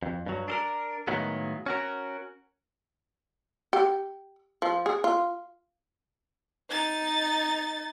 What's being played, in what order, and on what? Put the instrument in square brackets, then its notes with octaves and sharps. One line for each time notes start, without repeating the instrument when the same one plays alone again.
[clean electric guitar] F2
G2 F#3
D4 A4 A#4
A2 D#3 F#3 G#3 A#3 B3
C#4 F#4 A#4
[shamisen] G4
F3
G#4
F4
[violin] D#4 A6